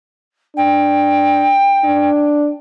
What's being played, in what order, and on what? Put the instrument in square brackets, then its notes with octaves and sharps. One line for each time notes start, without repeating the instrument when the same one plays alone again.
[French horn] D4 [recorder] G5
[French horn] D4